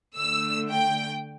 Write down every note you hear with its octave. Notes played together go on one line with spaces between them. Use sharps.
D3 A3 E6
G5